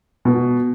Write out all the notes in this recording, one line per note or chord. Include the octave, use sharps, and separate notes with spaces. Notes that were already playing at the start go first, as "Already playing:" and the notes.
B2